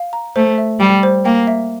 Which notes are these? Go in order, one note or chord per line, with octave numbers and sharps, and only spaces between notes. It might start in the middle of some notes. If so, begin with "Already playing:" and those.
Already playing: F5
A#5
A3 C5
E5
G3 G5
C5
A#3 G5
E5